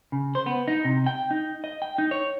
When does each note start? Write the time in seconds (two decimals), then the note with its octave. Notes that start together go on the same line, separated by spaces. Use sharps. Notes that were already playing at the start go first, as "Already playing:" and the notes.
0.12 C#3
0.35 C5
0.46 B3
0.68 D#4
0.85 C3
1.06 G5
1.31 D#4
1.64 D#5
1.82 G5
1.98 D#4
2.11 C#5